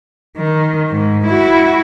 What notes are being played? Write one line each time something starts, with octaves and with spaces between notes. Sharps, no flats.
D#3
G#2
E4 F#4